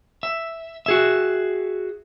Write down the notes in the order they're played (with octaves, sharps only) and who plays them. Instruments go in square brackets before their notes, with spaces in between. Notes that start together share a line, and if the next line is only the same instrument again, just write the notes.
[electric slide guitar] E5
F#4 G#4 E5